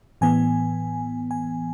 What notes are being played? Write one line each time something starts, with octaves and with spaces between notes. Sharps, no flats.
A2 E3 B3 G#5
G#5